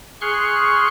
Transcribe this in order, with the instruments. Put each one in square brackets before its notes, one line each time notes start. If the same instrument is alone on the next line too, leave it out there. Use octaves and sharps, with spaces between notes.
[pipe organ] G#4 C6 C#6 F6 F#6